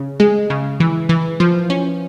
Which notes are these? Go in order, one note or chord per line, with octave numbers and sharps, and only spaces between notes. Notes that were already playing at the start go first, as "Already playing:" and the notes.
Already playing: C#3
G#3
C#3
E3
E3
F3
C#4